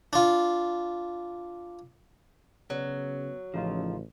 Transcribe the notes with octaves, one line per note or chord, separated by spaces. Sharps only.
D4 F4
C#3 F#3 B3
A1 C#3 F3 D#4 F4